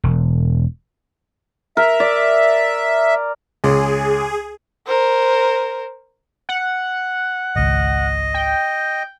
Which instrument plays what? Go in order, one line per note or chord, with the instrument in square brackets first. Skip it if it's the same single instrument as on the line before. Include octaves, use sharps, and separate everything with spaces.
[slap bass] E1
[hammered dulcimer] A#4 [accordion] E5
[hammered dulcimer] D5
[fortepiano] C#2 [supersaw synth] G#4
[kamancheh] A#4 C5
[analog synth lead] F#5
[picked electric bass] G#1 C#2 [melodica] D#5
[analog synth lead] G5